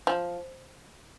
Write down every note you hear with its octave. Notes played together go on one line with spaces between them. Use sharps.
F3